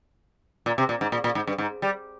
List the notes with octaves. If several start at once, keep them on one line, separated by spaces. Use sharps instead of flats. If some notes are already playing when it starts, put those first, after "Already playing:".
A#2
C3
A#2
G#2
A#2
A#2
G#2
G2
G#2
G3